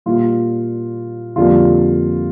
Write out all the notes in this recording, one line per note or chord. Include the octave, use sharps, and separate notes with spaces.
A#2 G3 A#3 F4
F2 D3 G3 A#3 F4